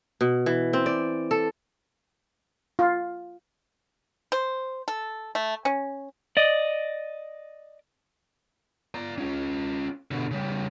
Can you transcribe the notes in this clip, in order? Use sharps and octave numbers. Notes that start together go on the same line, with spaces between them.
B2
E3
C4
D5
A4
F4
C5
A4
A3
C#4
D5 D#5
D5 A#5
C#4 F4
B2 D3
C#3 G3